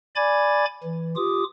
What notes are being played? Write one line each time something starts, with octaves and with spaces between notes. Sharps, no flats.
D5 G#5 B5 D6 G#6 A6
E3
F4 G4 D6 D#6